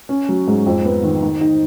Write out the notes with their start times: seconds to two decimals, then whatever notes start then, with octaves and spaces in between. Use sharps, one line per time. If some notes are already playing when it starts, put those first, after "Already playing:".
0.09 C#4
0.29 F#3
0.47 G#2
0.66 F2
0.85 B3
1.03 D#3
1.22 D#3
1.41 D#4